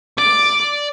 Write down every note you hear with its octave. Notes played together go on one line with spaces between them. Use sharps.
D5 D6